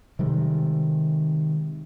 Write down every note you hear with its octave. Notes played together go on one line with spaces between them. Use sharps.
C3 D#3 G3 G#3